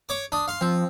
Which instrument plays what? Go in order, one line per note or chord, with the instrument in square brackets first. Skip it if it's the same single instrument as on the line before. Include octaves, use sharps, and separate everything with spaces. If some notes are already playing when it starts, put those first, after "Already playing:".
[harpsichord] C#5 D6
D4 D#6
F5 C6
[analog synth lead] F3 [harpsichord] C4